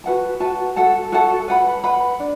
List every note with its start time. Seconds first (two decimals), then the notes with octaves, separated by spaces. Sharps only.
0.04 F#4 B4 F#5 A5
0.40 F#4 B4 F#5 A5
0.76 F#4 A4 F#5 A5
1.12 F#4 A4 F#5 A5
1.48 B4 F#5 B5
1.84 B4 F#5 B5
2.20 D4